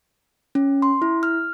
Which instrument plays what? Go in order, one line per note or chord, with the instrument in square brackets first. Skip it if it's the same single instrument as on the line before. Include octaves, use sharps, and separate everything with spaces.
[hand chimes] C#4
C6
E4
F6